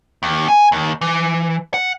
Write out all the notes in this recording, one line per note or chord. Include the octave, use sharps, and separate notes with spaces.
D#2
G#5
D#2
E3
F#5